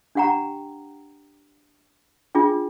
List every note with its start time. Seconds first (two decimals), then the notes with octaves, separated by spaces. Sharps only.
0.15 D4 G4 F#5 G5 A#5
2.35 D4 F4 G#4 G5